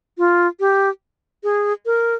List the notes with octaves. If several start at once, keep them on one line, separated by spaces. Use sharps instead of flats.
F4
G4
G#4
A#4